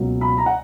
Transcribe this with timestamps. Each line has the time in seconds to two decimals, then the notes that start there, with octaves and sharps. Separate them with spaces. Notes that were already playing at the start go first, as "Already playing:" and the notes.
Already playing: C#2 B2 F#3 A#3
0.21 B5
0.38 A#5
0.46 F#5